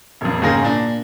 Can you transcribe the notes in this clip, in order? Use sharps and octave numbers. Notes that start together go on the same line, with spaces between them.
D#1 F2
D#2 G#2 C#3 G#4 A#4 A#6
A#2 D4